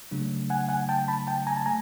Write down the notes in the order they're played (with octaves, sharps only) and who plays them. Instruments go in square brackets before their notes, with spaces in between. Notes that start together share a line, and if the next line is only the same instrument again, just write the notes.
[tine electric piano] C#3 F#3 A3 D4
[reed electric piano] F#5 G#5
F#5 G#5
G5 A5
A5 B5
G5 A5
G#5 A#5
A5
[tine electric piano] A3 [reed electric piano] G#5 A#5